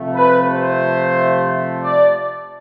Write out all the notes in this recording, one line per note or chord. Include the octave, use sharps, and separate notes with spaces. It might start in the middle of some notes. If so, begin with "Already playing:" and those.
Already playing: C3 F3 A3
B4
C5
D5